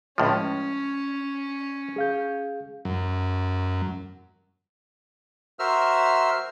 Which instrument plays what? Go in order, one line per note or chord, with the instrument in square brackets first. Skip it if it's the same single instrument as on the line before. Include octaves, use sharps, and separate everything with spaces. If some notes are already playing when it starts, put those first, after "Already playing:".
[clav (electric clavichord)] C#2 A2 F3 [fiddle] C#4
[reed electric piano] G#4 F5 G6
[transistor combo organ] F#2
[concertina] F#4 A#4 C5 E5 E6 F6